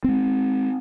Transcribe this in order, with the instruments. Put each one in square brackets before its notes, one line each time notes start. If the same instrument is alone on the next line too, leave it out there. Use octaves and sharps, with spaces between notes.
[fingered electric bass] G#3 C4